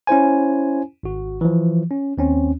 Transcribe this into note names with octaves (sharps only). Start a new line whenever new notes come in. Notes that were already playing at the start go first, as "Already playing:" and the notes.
C#4 E4 C5 G#5
G#1 F#4
E3 F3
C#4
D#2 C4 C#4